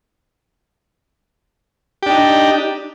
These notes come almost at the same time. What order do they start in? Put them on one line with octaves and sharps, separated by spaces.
G4 D4 D#4